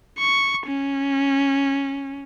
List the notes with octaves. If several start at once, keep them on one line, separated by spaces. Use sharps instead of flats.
C#6
C#4